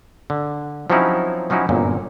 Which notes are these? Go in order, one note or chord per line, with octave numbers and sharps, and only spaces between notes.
D3
F3 F#3 C4 C#4 D#4 E4
F3 F#3 C#4 D#4 E4
G1 F#2 A#2